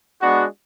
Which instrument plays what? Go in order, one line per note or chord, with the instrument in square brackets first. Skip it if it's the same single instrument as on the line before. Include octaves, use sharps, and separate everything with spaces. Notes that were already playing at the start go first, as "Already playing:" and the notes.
[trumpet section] G#3 B3 D4 F#4